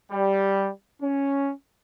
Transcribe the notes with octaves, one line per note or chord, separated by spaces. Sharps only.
G3
C#4